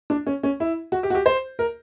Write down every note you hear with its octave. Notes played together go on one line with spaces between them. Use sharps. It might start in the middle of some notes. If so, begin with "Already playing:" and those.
D4
C#4
C#4
E4
F#4
G4
F#4
G4
C5
A#4